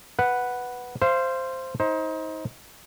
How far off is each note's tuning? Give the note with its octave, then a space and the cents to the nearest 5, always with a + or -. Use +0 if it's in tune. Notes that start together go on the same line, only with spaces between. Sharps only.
B4 +0 F#5 +0
C5 +0 F5 -30
D#4 +30 C5 +15